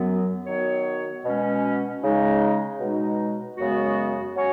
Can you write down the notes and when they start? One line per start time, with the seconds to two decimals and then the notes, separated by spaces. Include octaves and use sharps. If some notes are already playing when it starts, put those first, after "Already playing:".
Already playing: F#2 F#3 B3
0.46 D#3 F#3 B3 F#4 C#5
1.24 B2 G#3 C#4
2.03 C#3 G#3 D#4
2.80 B2 G#3 D#4
3.57 F#2 C#3 G#3 B3 F#4
4.35 F#3 C#4 F#4 C#5